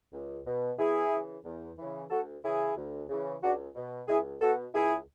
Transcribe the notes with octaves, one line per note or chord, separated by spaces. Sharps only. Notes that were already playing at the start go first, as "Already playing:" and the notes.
C#2
B2
E2 E4 G#4
C#3 E3
E2
C#3 E3
D2 F#4 A4
C#3 E3 E4 G#4
D2
C#3 E3
C#2 D4 F#4
B2
C#2 E4 G#4
B2 F#4 A4
C#2 E4 G#4